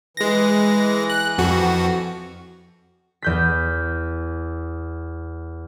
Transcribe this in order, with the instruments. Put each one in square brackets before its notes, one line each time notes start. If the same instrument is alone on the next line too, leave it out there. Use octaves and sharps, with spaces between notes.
[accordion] E3 [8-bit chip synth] G#3 A#6
[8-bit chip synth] F#6
F2 F#4
[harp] E2 G6 B6